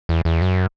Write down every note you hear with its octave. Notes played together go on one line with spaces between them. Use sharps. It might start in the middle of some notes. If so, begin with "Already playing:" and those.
E2
E2
F#2